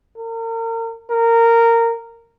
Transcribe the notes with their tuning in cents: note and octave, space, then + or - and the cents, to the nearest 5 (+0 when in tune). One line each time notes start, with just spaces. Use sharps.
A#4 -35
A#4 -15